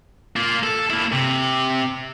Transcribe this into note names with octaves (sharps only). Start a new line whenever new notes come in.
A#3 F4
A4
A#3 E4
C3